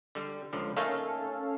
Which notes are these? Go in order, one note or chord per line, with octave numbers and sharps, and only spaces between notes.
D3 G3
C#2 D3 F3
A3 A#3 C#4 D#4 A4 F5